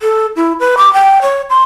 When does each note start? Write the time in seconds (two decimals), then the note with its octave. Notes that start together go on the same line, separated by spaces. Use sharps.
0.01 A4
0.36 E4
0.60 B4
0.77 D6
0.94 G5
1.22 C#5
1.50 C6